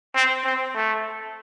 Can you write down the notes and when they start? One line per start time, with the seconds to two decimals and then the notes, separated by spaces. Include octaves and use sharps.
0.15 C4
0.45 C4
0.75 A3